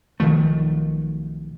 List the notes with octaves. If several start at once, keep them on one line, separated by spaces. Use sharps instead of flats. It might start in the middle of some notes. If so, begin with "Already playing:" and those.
B1 D#3 F3 A3